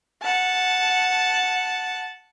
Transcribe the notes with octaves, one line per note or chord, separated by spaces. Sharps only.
F#5 A5